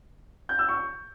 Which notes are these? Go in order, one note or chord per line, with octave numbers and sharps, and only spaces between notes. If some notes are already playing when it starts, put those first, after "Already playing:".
G6
E6
C#6